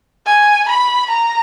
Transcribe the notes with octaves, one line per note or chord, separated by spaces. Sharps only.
G#5
B5
A#5